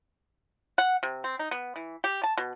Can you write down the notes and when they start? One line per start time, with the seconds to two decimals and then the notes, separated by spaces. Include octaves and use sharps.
0.78 F#5
1.03 C3
1.24 C4
1.39 D#4
1.51 B3
1.76 E3
2.04 G4
2.23 A5
2.38 B2